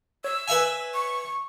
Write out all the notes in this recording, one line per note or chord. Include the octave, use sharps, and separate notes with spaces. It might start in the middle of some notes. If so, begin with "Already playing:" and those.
C#5 E6
B4 E5 G#5
C#6